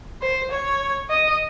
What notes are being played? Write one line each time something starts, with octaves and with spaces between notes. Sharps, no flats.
C5
C#5
D#5